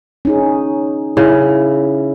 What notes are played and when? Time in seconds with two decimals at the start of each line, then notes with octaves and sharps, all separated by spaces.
0.25 C#4 D#4 G#4
1.17 C#3 E4